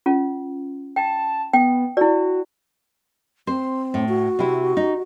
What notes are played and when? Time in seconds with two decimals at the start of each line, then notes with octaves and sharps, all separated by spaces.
0.06 C#4 F4
0.96 G5 A5
1.53 B3 G5
1.97 E4 F#4 D5
3.47 C4 C5
3.94 A2
4.08 F#4
4.39 C3 E4
4.77 D#4